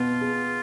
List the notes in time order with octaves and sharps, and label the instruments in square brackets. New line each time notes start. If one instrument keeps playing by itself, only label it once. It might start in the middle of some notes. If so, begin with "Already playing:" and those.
Already playing: [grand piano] B2 B3 [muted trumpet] F4
[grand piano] G#4